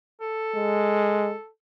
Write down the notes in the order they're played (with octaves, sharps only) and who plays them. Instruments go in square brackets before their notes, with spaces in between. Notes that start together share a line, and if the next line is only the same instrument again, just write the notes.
[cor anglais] A4
[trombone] G#3